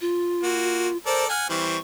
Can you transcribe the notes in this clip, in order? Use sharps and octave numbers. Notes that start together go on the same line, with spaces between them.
F4
A#3 F#4
A4 A#4 C5 D5
F#5 G#5 F6
E3 G3 C4 C#6